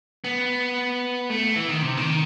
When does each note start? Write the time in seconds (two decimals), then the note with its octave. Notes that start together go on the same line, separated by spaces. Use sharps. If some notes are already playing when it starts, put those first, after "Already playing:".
0.24 B3
1.30 A3
1.56 E3
1.69 D#3
1.82 C3
1.97 D#3